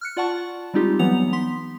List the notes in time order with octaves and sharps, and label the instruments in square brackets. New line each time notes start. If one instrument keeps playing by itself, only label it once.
[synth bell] F6 F#6 C#7
F4 D5 F#5 A5 C#6
G3 G#3 C4 D#4 F4 G4
E3 F#3 B3 D#4 F#5 F7
B3 C6 B6